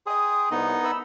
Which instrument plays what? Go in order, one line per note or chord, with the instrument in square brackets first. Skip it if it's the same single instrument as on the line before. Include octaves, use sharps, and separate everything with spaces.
[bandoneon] G#4 [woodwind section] G5 C6 D#6
[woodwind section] C2 [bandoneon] B3 D#4 D#5
[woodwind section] B5 E6